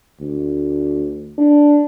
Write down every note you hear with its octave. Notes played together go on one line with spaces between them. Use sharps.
D2
D4